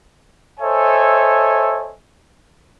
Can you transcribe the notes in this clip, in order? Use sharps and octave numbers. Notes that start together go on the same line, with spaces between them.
A4 C5 C#5 D#5 E5 G#5